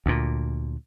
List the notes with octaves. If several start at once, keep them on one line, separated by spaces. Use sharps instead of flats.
D2 A#2